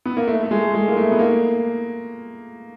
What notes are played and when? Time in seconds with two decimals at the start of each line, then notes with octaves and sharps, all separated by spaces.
0.05 B3
0.17 A#3
0.27 A3
0.43 A3
0.51 G#3
0.74 G#3
0.88 A#3
0.96 A3
1.12 B3
1.19 A#3